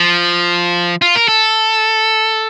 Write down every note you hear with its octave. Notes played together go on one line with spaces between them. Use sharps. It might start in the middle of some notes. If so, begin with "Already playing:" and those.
Already playing: F3
F4
A#4
A4